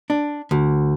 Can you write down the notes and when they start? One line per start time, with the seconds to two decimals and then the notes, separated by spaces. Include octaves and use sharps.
0.10 D4
0.51 D2